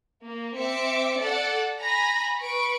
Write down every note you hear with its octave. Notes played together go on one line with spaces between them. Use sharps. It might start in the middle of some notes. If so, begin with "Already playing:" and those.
A#3
C4 E5 D6 C#7
A4 D5 F#5
G#5 A#5 B5 A#6
B4 C#6 D7